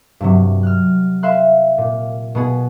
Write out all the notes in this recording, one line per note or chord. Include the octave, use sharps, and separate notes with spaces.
G2 C3 F#3
F6 F#6
E5 F5 C6 F#6
A#2
B2 B3 G#4